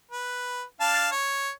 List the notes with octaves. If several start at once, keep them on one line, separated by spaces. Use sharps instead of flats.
B4
D4 F5 A5
C#5